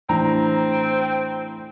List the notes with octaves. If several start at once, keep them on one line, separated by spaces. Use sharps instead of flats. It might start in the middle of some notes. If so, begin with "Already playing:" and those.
A2 E3 C4 D4 A#5